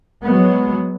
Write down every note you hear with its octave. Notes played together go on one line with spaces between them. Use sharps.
F#3 G#3 B3